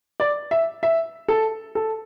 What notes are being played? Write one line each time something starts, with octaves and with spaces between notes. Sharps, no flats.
D5
E5
E5
A4
A4